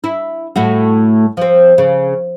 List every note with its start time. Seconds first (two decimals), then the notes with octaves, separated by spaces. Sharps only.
0.04 E4
0.56 A2 A3 F#4
1.37 F3 C4
1.78 C#3